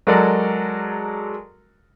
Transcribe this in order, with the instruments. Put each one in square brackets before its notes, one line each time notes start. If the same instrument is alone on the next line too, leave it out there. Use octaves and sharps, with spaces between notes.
[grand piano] F#3 G#3 F#4 A4 A#4 D5